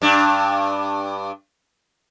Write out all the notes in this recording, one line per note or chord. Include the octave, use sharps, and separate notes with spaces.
G2 D4